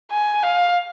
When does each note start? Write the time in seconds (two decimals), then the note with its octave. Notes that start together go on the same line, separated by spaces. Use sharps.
0.11 G#5
0.43 F5